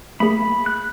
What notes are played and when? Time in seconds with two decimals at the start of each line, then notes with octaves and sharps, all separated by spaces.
0.20 A3 A#3 G#4 B5
0.66 F#6